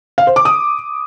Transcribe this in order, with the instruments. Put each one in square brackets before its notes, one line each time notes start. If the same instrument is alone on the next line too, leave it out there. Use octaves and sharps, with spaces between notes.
[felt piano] F5
C5
D6
D#6